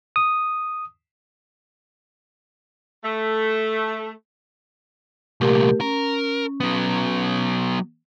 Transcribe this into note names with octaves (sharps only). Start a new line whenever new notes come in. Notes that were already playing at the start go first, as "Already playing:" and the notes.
D#6
A3
C2 A#2 A3 G4 A#4
C#4 A#4
F#3 B3